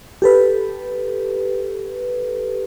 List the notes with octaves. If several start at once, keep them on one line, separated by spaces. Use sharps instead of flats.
G4 A4 B4